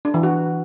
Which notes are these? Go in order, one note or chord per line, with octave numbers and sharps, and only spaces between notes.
D4
E3
F#4